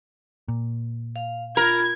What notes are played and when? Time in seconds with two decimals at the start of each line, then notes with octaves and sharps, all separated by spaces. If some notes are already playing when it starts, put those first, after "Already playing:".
0.48 A#2
1.16 F5
1.57 F4 A#4 B5 G#6